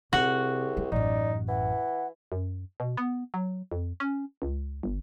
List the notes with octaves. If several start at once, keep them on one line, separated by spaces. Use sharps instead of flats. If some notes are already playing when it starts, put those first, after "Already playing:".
C2 C3 F#4 G#4
G#3
A1 F#2 D#4 D5
E3 F#5
F#2
B2
B3
F#3
F2
C#4
C#2
G1